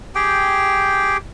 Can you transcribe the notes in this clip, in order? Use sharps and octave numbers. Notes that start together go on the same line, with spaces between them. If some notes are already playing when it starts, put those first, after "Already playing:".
G4 G#4 G5